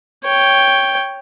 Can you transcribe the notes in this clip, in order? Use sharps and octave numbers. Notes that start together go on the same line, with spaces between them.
C#5 G5